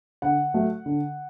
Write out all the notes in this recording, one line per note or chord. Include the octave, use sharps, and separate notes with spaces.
D3 F#5
F#3 A3
D3